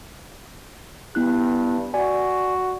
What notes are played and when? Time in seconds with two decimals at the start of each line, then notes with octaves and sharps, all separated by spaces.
1.15 G2 B3 E4 F#6
1.94 F#4 D5 G#5